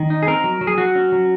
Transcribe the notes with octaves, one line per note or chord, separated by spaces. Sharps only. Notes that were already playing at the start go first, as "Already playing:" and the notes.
Already playing: D#3
D#4
G#4
C4 A#4
F#3
F#3
G#4
F#3 F#4
C#4
F#3